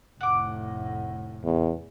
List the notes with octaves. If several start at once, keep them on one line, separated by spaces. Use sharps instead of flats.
F1 A2 F#5 D6
E2